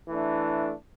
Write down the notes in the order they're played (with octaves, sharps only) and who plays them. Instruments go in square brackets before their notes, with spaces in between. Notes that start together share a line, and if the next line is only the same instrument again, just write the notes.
[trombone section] E3 A3 D4